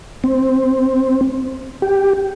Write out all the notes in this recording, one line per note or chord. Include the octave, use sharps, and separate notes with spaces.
C4
G4